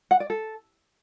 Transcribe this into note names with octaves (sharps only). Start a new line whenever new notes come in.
F#5
D5
A4